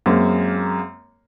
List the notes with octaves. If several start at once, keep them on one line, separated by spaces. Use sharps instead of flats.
F#2 G#3 A#3 C4